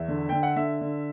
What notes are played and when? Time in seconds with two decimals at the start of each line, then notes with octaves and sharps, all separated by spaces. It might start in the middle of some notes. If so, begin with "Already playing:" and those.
Already playing: E2 E5
0.08 D3
0.29 D3 G5
0.43 F#5
0.56 D3 E5
0.81 D3